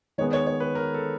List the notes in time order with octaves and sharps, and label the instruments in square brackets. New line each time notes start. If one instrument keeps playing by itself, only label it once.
[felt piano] D#3 G#3 B3 [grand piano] C#5
[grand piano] C#5
C#5
B4
A#4
A4